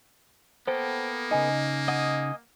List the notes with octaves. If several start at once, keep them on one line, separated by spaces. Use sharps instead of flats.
A#3 B3 A4 C5 G5
C#3 D#4 D#5 G#5
D#5 F#5 G#5 D#6